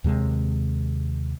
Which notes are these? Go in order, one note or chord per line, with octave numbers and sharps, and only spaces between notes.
D#2 C3 G#3